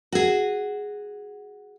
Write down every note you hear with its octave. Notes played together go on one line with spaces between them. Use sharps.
F#4 G#4